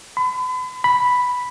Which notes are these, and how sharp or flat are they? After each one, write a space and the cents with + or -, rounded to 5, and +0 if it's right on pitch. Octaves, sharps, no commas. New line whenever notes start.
B5 +40
B5 +0